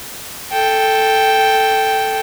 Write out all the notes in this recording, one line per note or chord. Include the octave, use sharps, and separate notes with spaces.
A4 G5